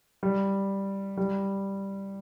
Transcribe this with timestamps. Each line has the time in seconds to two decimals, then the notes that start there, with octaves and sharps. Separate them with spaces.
0.23 G3
1.17 G3